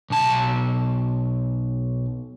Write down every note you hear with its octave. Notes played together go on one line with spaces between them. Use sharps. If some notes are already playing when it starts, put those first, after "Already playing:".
B1 A5